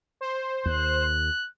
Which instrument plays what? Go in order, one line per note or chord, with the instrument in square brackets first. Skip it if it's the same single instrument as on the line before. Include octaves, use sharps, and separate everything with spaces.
[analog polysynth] C5
[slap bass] D#2 [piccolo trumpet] F#6